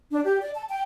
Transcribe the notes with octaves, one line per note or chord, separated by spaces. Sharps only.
D4
G4
D5
A5
G5